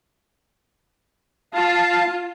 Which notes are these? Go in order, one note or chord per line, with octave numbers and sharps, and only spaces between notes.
F4 F5 A5